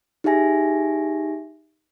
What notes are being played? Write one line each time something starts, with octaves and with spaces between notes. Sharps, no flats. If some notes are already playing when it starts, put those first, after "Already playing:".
D#4 G4 G#4 E5 G#5 A#6